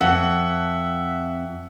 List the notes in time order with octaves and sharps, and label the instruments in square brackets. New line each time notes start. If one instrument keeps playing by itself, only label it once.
[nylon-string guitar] F2 [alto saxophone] E5 [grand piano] F#5